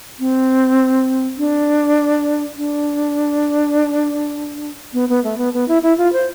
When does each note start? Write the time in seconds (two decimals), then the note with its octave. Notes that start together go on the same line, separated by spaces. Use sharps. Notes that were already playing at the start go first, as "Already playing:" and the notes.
0.20 C4
1.38 D4
2.57 D4
4.93 B3
5.09 B3
5.24 A3
5.38 B3
5.54 B3
5.68 E4
5.83 E4
5.98 F4
6.13 C5